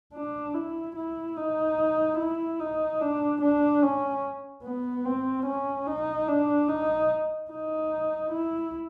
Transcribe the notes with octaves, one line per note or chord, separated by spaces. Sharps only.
D4
E4
E4
D#4
E4
D#4
D4
D4
C#4
B3
C4
C#4
D#4
D4
D#4
D#4
E4